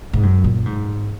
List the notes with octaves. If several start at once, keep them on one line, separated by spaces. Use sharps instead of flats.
G#2
F#2
A#2
G#2